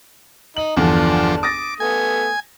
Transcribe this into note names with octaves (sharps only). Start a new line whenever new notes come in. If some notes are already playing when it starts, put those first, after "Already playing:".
D#4 F#7
G1 E2 F3 D4 D5 A5
D6 D#6 A6 A#6
A3 B3 G#5